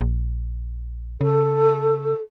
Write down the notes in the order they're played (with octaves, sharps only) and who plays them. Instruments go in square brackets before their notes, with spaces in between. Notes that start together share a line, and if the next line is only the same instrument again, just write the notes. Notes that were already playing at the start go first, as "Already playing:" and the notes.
[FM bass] A#1
[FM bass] C#3 [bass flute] A4